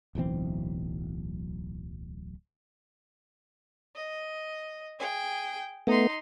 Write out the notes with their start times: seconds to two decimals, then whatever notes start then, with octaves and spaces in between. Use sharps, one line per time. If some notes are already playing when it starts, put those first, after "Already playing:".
0.15 D1 B1 E3 C4
3.96 D#5
4.99 G#4 G5
5.87 A3 B3 D#4 C6